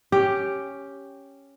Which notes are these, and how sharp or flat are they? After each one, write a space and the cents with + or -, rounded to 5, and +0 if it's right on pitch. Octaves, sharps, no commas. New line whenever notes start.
C#4 +0 G4 +0